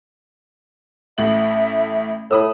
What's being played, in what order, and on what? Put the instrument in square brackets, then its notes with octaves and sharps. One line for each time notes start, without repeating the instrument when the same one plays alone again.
[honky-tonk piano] A1 A2 F#7 [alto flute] E5
[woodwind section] A2 [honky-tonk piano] B5 D#6 E6